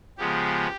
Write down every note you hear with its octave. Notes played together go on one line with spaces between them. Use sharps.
C#3 F3 G#3 B3 G4